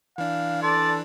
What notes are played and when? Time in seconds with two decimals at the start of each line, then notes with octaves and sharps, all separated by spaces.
0.18 E3 D4 F5
0.62 A4 D5 C6